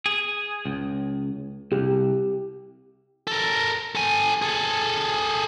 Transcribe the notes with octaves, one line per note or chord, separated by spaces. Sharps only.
G#4
C#2
C2 G4
A4 A#4
A4 G#5
G#4 A4